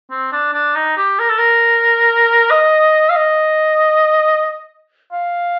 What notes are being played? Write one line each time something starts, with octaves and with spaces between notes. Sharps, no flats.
C4
D4
D4
D#4
G4
A#4
A4
A#4
D#5
F5
D#5
F5